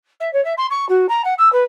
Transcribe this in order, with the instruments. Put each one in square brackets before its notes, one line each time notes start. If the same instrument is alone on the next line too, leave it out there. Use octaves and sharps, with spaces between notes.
[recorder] E5
C#5
E5
C6
C#6
F#4
A#5
F#5
E6
B4